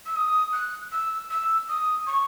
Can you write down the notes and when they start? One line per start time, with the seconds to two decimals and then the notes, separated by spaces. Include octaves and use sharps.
0.05 E6
0.15 D#6
0.53 F#6
0.91 E6
1.30 E6
1.68 D#6
2.06 C#6